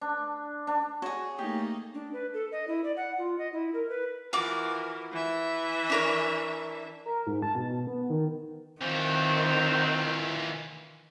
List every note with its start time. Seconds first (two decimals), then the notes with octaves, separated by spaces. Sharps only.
0.01 D4
0.67 D4
1.02 F#4 G#4 C#5
1.39 A3 A#3 D#4 G4
1.94 D4
2.13 B4
2.34 A4
2.52 D#5
2.68 E4
2.84 D5
2.97 F#5
3.18 F4
3.38 D#5
3.53 E4
3.74 A#4
3.89 B4
4.33 E3 F4 F#4 A#4 D6
5.11 E3 E5
5.90 D4 A#4 C#5
7.06 A#4
7.27 G#2
7.42 A5
7.55 B2
7.87 B3
8.10 D#3
8.81 A#2 D#3 E3 F#3 C4 F4